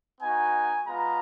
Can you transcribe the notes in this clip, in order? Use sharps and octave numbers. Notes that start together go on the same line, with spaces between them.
B3 D#4 F#4 G#5
G#3 B3 F4 A#5